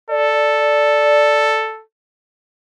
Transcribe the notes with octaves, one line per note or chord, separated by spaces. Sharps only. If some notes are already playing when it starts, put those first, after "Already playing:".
A4 D5